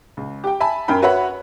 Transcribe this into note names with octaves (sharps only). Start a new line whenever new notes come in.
C#2
G4 G5
E5 G#5 A5 B5
F#2 A#4 G5 B5
F#4 B4 C#5 E5 F#5 B5